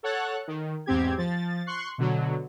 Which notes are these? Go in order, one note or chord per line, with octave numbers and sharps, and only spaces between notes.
A4 C#5 F#5 F#6 A6
D#3
E2 G#2 C4 G4 G#6
F3 A6
C6 C#6 F#6 C7
B2 D3 F#3